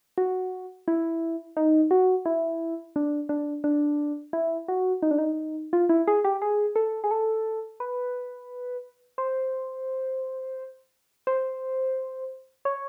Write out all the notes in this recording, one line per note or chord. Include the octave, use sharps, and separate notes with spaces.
F#4
E4
D#4
F#4
E4
D4
D4
D4
E4
F#4
D#4
D4
D#4
F4
E4
G#4
G4
G#4
A4
G#4
A4
B4
C5
C5
C#5